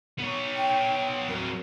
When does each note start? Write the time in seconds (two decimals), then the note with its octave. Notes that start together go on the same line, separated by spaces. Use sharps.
0.18 B3 C#5
0.57 G5
1.28 F#3 C4 A#4